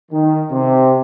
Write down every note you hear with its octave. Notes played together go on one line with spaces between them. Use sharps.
D#3
C3